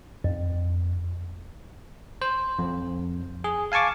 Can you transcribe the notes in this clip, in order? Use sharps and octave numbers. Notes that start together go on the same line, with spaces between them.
F2
C5
F2
G#4
F5 G#5 A5 C#6 D6